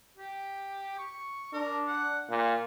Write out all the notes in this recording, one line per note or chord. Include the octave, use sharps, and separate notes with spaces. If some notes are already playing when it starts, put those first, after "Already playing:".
G4
C#6
D4 A#4
F#5
A#2 F5